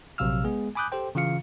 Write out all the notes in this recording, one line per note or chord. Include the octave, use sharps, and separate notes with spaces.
A#1 C3 F#3 F5 E6 F6
G#3 B3 G#4
G#5 B5 D6 D#6 F#6 G6
G4 A4 C5 G5
C#3 E3 F4 F5 C#7